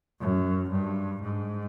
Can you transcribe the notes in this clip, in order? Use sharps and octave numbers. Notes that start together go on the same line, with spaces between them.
F#2
G2
G#2